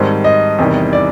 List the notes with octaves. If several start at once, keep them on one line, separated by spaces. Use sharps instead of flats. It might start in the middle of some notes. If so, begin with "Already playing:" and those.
Already playing: G#2 D#3 G3 C4 A5
D#5
E2 C3 D#3 G3
D5